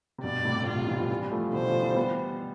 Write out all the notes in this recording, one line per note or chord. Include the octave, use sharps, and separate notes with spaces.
C3
G2 B2 D5
A2 C3
B2 F4
C3
G2 B2
C3 E3
F3
E3 G3
G3
F3 A3
B2 D3 C5
D3 F3
E3 G3
G3 B3